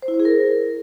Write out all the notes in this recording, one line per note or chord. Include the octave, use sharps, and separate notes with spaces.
C5
E4
C5
G#4
A#4